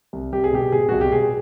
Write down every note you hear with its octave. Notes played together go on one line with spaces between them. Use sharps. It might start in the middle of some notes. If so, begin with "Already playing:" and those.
C2
C2 G4
G#4
B2 G4
B2 G#4
C2 F#4
G4
B2 G#4